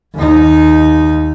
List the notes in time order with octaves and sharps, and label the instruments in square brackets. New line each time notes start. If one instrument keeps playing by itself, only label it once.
[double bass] D#2 D#4